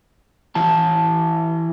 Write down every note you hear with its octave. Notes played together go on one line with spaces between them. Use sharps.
E3 E4 A5